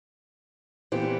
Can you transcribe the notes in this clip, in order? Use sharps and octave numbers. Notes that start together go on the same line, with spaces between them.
A#2 E3 B3 C4 G4 C5